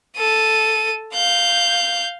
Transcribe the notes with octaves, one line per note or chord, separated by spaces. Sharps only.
A4 D#7
F5 G6